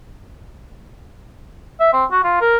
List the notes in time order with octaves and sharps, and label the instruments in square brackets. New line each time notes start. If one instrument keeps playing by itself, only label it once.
[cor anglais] E5
C4
F#4
F4
A#4